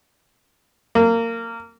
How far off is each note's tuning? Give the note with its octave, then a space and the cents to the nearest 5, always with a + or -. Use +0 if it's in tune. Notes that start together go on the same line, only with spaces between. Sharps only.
A#3 -20